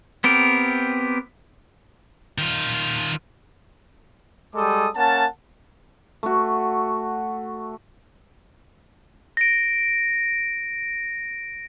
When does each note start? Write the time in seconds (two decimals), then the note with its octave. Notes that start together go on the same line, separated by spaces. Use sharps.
0.24 B3 C4 G4 A#4
2.38 D#3 F4
4.55 G3 G#3 A4 D6 D#6
4.95 A#3 C#4 F#5 A5
6.23 A3 F#4
9.37 A#6 D7